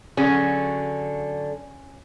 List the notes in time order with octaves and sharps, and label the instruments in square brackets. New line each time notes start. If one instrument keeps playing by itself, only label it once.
[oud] D3 F#3 G#4 [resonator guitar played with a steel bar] C#4